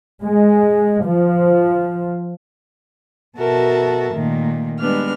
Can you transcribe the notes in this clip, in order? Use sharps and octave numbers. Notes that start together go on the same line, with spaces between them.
G#3
F3
B2 F#4 A4 A#4 E5 A5
A#2 D#3 A3
G3 G#3 B3 D4 B4 F6